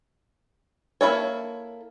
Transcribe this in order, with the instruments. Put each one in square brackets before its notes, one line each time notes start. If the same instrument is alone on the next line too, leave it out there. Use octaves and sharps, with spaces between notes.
[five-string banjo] A#3 D#4 E4 A4 C#5